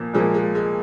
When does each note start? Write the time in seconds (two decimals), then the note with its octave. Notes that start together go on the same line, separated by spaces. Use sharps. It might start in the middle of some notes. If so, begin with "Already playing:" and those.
Already playing: A#2 F3 A#3
0.14 A#2 F3 G#3 A#3
0.34 G#3
0.55 G#3